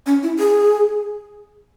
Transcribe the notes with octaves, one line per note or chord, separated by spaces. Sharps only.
C#4
E4
G#4